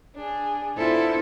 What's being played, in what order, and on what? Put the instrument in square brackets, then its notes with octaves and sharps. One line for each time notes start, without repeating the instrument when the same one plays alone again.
[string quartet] D4 G#4
B3 D4 E4 F4 A4 C5